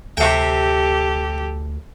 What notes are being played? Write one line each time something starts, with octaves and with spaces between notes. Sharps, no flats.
D2 C3 G4 A4 G5